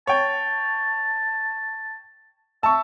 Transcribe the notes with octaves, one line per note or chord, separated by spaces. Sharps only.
C#5 G5 A5
E5 A5 C#6